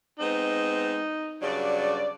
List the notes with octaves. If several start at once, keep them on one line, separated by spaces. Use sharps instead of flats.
G#3 B3 C4 D#4
G2 C#3 F#3 D5